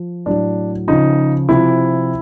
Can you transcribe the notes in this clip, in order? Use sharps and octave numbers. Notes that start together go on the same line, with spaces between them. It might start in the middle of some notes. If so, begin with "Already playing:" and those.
Already playing: F3
A2 F#3 D4
C#3 F3 D#4
C3 F3 E4